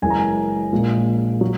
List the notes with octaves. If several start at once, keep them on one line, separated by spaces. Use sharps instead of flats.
F#1 F#2 E3 G#3 G#5
A#5
G#5
A#1 A#2 G#3
F#3